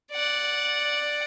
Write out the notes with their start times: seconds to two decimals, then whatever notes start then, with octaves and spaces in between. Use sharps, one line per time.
0.11 D5 F#5